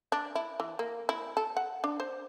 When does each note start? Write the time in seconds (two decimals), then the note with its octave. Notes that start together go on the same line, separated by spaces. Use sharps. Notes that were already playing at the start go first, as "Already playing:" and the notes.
0.12 D4
0.35 E4
0.60 E3
0.79 A#3
1.09 E4
1.37 A4
1.57 F#5
1.84 D4
2.00 C5